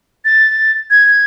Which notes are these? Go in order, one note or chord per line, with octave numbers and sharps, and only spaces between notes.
A6
G#6